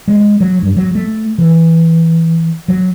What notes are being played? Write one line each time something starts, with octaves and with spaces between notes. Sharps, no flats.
G#3
F#3
G2
F#3
A3
E3
F#3